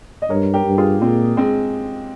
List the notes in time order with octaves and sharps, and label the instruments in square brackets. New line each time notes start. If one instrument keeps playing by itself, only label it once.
[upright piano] D#5
[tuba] G2 [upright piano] A#4 C#5
[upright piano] G4 A#4
[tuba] G2
[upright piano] F4 G#4
[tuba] A#2 [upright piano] G#3 C4
[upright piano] G#3 C4